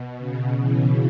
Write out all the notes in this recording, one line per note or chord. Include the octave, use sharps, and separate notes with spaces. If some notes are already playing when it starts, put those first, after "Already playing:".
Already playing: B2
C#3
E3